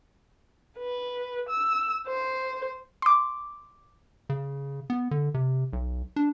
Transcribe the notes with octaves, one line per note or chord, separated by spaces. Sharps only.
B4
E6
C5
C6 D6
C#3
B3
D3
C3
B1
D4